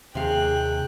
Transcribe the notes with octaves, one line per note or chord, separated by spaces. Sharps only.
D#2 C3 G#4 F5 G5 F#6